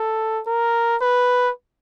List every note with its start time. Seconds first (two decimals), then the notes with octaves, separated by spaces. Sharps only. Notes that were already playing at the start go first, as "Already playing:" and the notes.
Already playing: A4
0.47 A#4
1.01 B4